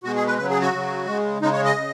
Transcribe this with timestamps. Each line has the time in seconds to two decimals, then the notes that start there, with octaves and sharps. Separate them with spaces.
0.04 B2 G#3 F#4
0.16 G#4
0.27 B4
0.38 C#3 F#3 B4
0.50 G#4
0.61 F#4
0.72 C#3 F#3
1.07 C#3 G#3
1.41 C#3 G#3 D#4
1.53 C#5
1.65 D#5
1.76 C#3